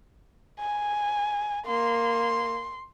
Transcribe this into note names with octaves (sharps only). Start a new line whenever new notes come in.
G#5
A#3 C6